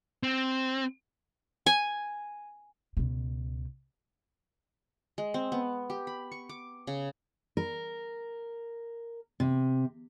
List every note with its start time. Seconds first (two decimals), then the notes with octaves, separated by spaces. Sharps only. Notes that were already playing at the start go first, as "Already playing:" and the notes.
0.23 C4
1.66 G#5
2.97 C#2 B2
5.18 G#3
5.34 C4
5.52 B3
5.90 G4
6.07 B5
6.32 C#6
6.49 D6
6.87 C#3
7.57 A#4
9.40 C3